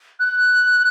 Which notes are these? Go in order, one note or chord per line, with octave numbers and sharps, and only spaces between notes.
F#6